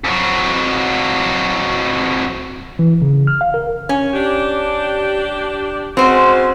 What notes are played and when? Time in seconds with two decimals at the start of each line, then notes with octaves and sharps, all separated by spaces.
0.04 F2 F#3
2.79 E3
3.02 C#3
3.27 F6
3.41 F5
3.54 A#4
3.89 C#4
4.14 D4 G4
5.97 C#3 G#3 C4 F#4 C5